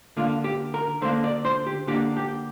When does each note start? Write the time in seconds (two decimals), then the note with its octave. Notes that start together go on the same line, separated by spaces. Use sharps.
0.17 D3 A#3 D4 F4
0.44 G4
0.74 A#4
1.02 D3 A#3 D4 C5
1.24 D5
1.45 C5
1.67 G4
1.87 D3 A#3 D4 G4
2.17 G4